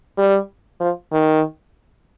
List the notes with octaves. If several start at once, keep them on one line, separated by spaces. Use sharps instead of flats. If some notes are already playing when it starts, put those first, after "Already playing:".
G3
F3
D#3